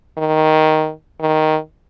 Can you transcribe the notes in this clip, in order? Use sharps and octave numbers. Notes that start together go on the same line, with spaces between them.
D#3
D#3